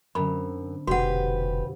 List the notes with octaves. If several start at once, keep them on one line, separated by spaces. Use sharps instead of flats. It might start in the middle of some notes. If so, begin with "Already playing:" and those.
F#2 D3 C4 B5
F1 F2 B2 G3 F#4 G4 B4 F#5